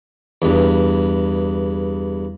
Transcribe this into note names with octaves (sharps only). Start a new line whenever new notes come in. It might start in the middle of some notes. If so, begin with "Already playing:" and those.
E2 G2